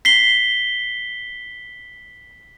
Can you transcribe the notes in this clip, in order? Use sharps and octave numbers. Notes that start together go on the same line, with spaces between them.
B6 C7 G7